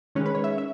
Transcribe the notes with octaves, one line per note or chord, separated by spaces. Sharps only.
D#3 G#3 C#4 B4
B4
C#5
E5
E5